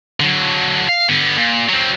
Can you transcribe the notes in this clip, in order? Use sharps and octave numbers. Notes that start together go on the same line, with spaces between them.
D3 F#3
F5
D3 B3
A#2
F#3 C4